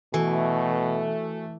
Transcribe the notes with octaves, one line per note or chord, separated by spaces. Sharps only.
B2 E3 A3 F#4 A4 G#5